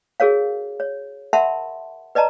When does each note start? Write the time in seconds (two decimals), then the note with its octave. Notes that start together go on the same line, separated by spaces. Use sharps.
0.20 F#4 G#4 A#4 C#5 F5
0.80 C#5
1.33 A#4 E5 F#5 A5 B5 C6
2.15 B4 D5 D#5 A5 A#5